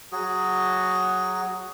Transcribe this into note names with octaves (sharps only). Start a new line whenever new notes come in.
F#3 F#4 G#4